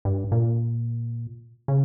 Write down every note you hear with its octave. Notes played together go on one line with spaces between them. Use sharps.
G2
A#2
C#3